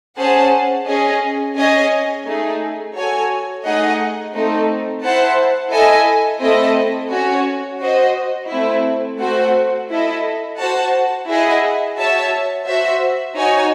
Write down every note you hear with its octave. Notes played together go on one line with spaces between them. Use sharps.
C#4 G#4 C5 F#5 A5
C#4 G#4 D#5
C#4 G#4 D#5 G#5
A3 D#4 G#4
F#4 A4 C#5 G#5
A3 D#4 G#4 D#5 F#5
A3 C4 D#4 A4
E4 C5 F#5 A5
E4 A4 D#5 G#5
A3 C4 E4 A4 D#5
C#4 F#4 C#5
F#4 C5 D#5
A3 C4 E4
A3 C4 F#4 C5 F#5
E4 A4 D#5
F#4 C5 F#5 A5
E4 G#4 D#5 F#5
F#4 C#5 E5 A5
F#4 C5 E5
D#4 F#4 C#5 G#5